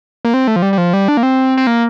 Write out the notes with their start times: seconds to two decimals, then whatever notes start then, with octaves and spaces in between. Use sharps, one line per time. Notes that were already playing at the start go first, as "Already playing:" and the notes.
0.25 A#3
0.34 C4
0.48 A3
0.56 F3
0.62 G3
0.73 G3
0.78 F3
0.93 G3
1.08 D4
1.17 A#3
1.23 C4
1.57 C4
1.67 A#3